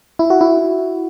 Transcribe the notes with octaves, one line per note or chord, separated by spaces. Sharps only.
E4
F#4
E4